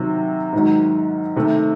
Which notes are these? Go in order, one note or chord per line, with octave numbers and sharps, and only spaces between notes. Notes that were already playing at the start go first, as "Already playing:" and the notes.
Already playing: C3 D#3 F#3
G#2 D#3 F#3
C3 D#3 A3